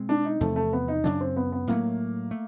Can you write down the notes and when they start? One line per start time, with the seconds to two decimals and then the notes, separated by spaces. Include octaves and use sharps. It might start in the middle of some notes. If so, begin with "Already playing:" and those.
Already playing: B2 G#3 C4
0.09 D4
0.25 D#4
0.40 E2 C3 F3 A3
0.56 A3
0.73 B3
0.88 D#4
1.04 F#2 C#3 F#3 D4
1.21 C4
1.37 B3
1.52 B3
1.67 A2 F#3 A3 A#3
2.31 A3